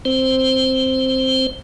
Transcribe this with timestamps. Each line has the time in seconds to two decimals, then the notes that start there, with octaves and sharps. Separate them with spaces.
0.05 C4 C5